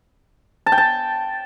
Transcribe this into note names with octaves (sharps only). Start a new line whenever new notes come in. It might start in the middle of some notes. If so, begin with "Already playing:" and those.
A5
G5
A5